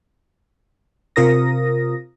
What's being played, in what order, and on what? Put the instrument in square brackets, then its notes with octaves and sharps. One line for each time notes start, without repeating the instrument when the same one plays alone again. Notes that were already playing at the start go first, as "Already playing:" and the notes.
[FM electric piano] C3 F4 A#4 D#6 A#6